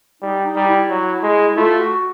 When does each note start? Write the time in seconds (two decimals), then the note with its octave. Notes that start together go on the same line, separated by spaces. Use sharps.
0.22 G3 D#4
0.44 D#4
0.56 G3
0.67 E4
0.90 F#3
1.23 G#3
1.57 A3 F4
1.79 F#4